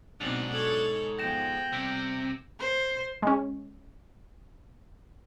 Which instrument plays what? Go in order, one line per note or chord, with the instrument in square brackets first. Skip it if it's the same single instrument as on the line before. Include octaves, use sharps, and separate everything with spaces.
[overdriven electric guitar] G#2 [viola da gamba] B2 C4 D#4 [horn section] F#3 D4 [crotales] F7 F#7
[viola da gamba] A4 C#5 [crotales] G#6 F#7
[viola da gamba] F3 G#3 B3 [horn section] G5 [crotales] A#6 E7
[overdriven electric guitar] C3 [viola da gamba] G3 [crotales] E6 G6 D7
[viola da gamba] C5
[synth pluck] G#3 C#4